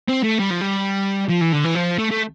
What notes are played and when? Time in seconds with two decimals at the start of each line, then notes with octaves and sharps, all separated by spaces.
0.08 C4
0.23 A3
0.39 G3
0.50 F3
0.61 G3
1.29 F3
1.41 E3
1.52 D3
1.64 E3
1.75 F3
1.98 A3
2.11 A3